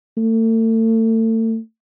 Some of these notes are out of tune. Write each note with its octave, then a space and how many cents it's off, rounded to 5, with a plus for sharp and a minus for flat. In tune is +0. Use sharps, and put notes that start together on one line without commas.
A3 +35